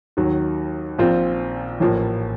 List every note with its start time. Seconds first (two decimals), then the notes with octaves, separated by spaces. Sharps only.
0.17 D#2 D#3 F#3
0.98 A#1 A#2 F3 C4 F4
1.80 A1 A2 F3 A#3